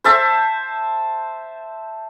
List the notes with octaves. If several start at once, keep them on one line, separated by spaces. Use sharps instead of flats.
C5 E5 A5